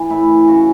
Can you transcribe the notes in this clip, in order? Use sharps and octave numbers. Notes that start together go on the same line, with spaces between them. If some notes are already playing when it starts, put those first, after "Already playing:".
Already playing: E3
A2 E4
E3
C#3 F#4